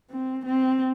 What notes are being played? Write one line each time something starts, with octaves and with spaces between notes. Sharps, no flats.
C4
C4